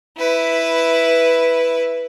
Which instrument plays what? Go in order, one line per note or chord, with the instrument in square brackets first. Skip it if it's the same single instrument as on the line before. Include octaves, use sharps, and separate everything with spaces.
[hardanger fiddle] E4 B4